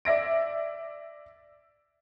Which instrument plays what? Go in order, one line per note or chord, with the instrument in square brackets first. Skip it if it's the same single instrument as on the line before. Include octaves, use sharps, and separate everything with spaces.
[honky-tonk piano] D5 E5 A#6 D7